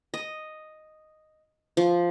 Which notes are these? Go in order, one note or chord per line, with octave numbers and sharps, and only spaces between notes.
D#5
F3